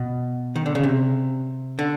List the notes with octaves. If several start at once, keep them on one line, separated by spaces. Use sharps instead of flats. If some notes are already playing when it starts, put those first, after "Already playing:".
Already playing: B2
D#3
D3
C#3
C3
D3